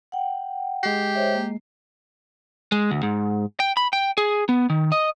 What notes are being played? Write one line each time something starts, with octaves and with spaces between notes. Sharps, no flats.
F#5 G5
G#3 G4 C7
C5 C#5 E5
A#3
G#3
D2
G#2
G5
B5
G5
G#4
B3
D#3
D#5